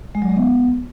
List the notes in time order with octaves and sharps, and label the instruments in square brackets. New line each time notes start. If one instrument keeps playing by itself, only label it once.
[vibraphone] G#3
F#3
G#3
B3